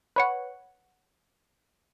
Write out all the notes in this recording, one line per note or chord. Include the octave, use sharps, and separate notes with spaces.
B4 C#5 F#5